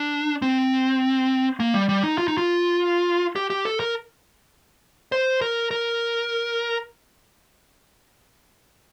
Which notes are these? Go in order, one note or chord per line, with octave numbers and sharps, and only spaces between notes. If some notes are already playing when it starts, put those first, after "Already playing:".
Already playing: D4
C4
A#3
G3
G3
D#4
F4
D#4
F4
G4
G4
A4
A#4
C5
A#4
A#4